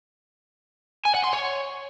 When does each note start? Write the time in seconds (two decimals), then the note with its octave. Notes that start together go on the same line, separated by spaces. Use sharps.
1.05 G#5
1.15 F#5
1.24 C6
1.33 C#5